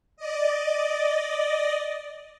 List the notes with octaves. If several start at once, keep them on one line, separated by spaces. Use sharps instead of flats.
D5 D#5